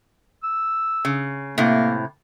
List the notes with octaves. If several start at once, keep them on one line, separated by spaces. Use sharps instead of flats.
E6
C#3
A2 C3 A#3